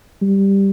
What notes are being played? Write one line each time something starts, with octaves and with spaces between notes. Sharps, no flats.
G3